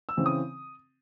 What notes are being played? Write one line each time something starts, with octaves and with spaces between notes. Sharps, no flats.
E6
C#3 E3 C4
D#6